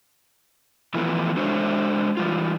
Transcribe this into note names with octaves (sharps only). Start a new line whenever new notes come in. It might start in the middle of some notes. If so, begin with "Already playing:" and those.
E3 F3 A3 B3 E4
G#3 D4 F#4 C5 C#5 E5
E3 G3 F4